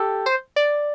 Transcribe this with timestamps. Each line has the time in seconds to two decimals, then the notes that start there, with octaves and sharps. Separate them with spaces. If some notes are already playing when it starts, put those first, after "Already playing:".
Already playing: G4 A4
0.26 C5
0.56 D5